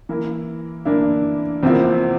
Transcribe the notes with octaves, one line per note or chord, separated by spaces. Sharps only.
E3 A#3 E4
E3 A#3 D4 E4
E2 C3 F3 A#3 C4 E4